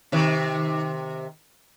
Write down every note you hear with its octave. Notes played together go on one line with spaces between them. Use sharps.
C3 D#3